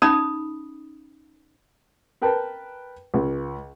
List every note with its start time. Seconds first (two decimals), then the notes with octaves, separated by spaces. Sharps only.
0.02 C#4 D#4 B5 D#6
2.22 A#4 B4 G5 A5
3.14 C#2